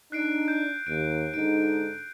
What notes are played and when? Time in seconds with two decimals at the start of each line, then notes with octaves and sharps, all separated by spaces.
0.12 D4 D#4 F#6 C7 D7
0.48 G6
0.87 D#2 D7
1.34 G#2 D3 D#4 D7